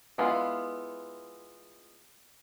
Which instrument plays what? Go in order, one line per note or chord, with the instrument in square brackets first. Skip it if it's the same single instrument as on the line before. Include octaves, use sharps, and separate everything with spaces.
[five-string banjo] G#3 B3 E4 F4